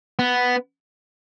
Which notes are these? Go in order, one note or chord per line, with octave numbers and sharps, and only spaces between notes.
B3